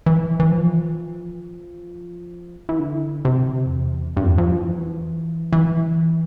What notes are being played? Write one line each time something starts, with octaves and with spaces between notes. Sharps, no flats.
E3
E3
F3
E3
D3
C3
F2
E2
G2
F2
E2
F2
F3
E3
E3